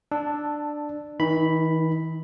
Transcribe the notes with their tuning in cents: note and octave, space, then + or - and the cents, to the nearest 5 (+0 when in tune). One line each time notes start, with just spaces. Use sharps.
D4 +10 A5 +0 E6 -5
E3 -45 D#4 +0 B5 +0